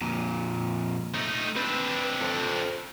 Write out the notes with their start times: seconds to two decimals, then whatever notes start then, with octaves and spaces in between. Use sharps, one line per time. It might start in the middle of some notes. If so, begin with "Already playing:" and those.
0.01 F2 A#2
1.14 A3 D#4
1.57 C4 D4 B4
2.22 A4 C5